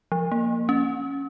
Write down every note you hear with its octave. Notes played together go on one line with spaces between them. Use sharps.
F3
A#3
C#4